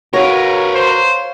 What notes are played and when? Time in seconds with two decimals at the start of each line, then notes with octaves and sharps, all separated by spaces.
0.13 F#4 A#4 B4 C#5 F5
0.75 C5